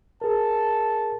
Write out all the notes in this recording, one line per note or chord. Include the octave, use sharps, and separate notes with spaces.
G#4 A#4 A5